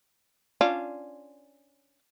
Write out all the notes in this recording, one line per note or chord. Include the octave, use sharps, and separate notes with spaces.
C#4 D4 F4